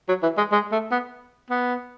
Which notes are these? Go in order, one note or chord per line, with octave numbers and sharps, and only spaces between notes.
F#3
E3
G#3
G#3
A3
B3
B3